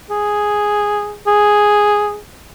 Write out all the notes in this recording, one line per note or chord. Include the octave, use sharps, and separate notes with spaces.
G#4
G#4